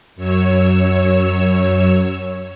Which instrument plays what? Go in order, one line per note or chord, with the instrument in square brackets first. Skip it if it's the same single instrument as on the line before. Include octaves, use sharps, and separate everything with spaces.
[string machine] F#2 C#5 E6